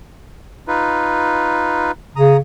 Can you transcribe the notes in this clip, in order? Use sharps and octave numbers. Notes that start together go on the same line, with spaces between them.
D#4 F4 B4
C#3 A#5 D#6